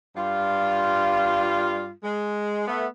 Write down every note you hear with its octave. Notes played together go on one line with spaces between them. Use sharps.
G2 G3 F4
G#3
A3 B3